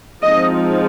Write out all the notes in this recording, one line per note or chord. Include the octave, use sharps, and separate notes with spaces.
F3 G#3 C4 D#4 D#5